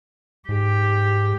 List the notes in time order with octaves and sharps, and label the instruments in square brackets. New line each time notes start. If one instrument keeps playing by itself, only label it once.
[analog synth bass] G#2 [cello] G4